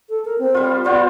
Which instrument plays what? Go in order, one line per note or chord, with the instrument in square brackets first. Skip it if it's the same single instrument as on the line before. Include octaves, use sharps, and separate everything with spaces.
[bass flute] A4
A#4
C4
[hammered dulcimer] G3 F4
[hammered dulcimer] B3 F4 C5 [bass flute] D5